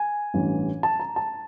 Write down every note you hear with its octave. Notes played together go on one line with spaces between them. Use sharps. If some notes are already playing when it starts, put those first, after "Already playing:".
Already playing: G#5
A1 G2 E3
A5
A#5
A5